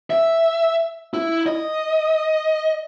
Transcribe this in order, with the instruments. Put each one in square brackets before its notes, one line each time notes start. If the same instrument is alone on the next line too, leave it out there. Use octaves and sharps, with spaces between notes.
[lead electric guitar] E5
E4
D#5